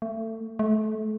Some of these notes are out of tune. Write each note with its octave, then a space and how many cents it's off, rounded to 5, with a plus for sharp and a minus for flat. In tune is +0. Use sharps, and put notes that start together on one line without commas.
A3 +25
A3 -30